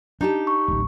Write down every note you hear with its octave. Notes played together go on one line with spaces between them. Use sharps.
D4 D#4 G4 A5
C#6
D1 A1